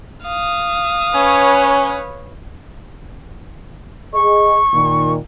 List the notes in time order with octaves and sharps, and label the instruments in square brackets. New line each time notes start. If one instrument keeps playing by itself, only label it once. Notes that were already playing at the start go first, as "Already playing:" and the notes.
[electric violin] F5 D#6
[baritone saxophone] C#4 [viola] B4 C#5
[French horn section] G#4 D#5 [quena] C#6
[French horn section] A#2 D#3